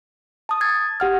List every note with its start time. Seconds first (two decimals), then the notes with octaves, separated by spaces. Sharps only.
0.49 A5 D#6
0.60 E6 G#6 A6
1.00 G4 F#5 F6